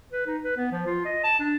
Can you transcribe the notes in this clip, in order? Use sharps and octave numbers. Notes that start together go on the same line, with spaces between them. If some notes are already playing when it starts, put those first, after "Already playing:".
B4
D#4
B4
B3
F3
F4
D#5
A5
D4